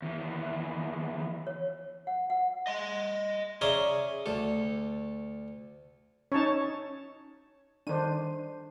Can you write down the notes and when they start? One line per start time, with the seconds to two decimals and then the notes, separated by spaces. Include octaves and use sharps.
0.02 D#2 E3
1.47 C#5
2.07 F#5
2.30 F#5
2.67 D#5 C6
3.61 C#4 G#4 D5 E5 A#5 C6
4.26 D2 A4
6.32 C#4 D#4 C#5 A5
7.87 D#3 D4 C5 D#7